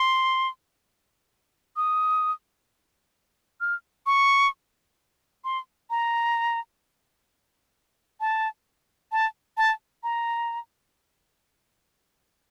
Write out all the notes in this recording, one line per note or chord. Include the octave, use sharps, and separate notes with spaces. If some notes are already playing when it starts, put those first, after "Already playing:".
Already playing: C6
D#6
F6
C#6
C6
A#5
A5
A5
A5
A#5